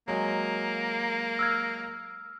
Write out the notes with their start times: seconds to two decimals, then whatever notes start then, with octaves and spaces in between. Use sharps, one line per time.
0.08 F#3 G#3 A#3
1.39 E6 F6 G#6